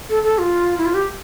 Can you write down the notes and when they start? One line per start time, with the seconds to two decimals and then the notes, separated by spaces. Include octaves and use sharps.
0.09 A4
0.23 A4
0.38 F4
0.78 E4
0.85 F4
0.94 G4